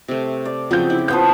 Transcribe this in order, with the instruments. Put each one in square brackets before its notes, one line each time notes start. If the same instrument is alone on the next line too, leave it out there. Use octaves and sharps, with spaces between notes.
[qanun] C3 A3
[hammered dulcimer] D5
[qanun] C#3 F#3 C4 [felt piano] F3 G6
[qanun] E4
[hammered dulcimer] F3 B3 F5 [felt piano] G6